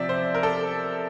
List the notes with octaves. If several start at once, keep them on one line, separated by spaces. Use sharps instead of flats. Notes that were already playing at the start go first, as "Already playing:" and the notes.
Already playing: C3 F3 C4 D5 E5
C5
A#4
A4